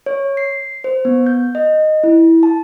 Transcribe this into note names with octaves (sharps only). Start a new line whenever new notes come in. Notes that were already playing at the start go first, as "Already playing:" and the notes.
C#5
C7
C5
B3
G6
D#5
E4
A5